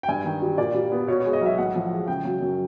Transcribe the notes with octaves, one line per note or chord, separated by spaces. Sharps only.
G5
G2 G#5
D#3
G3
A#2 D5
G3
B3
B2 C#5
G#3 C#5
D#5
B1 E5
A2 F#5
F3
G#3
C#3 G5
F#3
F#2